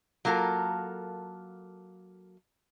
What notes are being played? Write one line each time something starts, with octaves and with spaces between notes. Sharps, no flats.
F#3 A#3 F4 A4 A#4